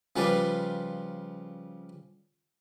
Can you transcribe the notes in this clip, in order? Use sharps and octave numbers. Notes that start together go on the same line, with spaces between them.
C#3 F3 G3 F4 B4 D5